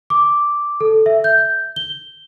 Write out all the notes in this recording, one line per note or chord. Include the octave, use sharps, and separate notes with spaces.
D6
A4
E5
G6
G7